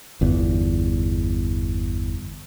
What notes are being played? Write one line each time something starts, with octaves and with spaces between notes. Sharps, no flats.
G1 E2